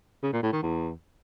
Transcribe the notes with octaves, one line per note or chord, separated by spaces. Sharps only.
C#3
A#2
A2
D#3
E2